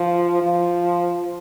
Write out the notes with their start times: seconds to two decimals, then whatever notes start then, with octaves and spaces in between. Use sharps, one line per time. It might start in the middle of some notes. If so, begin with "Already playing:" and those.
Already playing: F3
0.43 F3